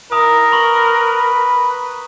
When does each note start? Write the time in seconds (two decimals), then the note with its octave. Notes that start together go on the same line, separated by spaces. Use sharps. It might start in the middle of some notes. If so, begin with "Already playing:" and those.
0.12 E4 A#4 A#5 D#6
0.52 B4 B5 C#6 F#7